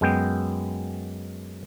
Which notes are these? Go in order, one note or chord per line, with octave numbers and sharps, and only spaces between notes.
F#2 G#3 B3 G5